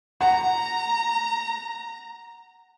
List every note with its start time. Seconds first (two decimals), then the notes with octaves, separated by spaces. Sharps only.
0.21 F#5 A#5